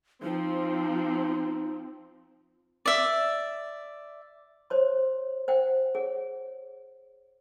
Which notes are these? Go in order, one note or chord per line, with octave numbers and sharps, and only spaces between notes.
F3 C4 D#4
D5 E5
C5 C#5 C6
C5 F#5 G5
G#4 C#5 F#5